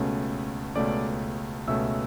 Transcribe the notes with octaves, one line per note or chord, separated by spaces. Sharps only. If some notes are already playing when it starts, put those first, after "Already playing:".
Already playing: C#2 B2 A3 C#4
C#2 B2 A3 C#4 D5 D6
C#2 B2 A3 C#4 E5 E6